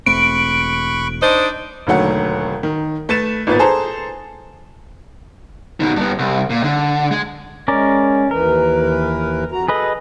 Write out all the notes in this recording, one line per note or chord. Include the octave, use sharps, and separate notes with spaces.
E1 A3 C4 B5 C#6 F#6 D7
D4 D#4 C5
E1 D#2 D3 F#3 A3 F#5
D#3
A3 B4 A6 C#7 E7
G#1 A#2 B3 B4 A6
G#4 A4 C5 A5 A#5
B2 D#3
G2 B3
C2
A#2
D3
G#3
G#3 C#4 A#4 D5
D#2 E3 A#4 B4
F2 F#4 A#5
G#4 A4 B4 D#5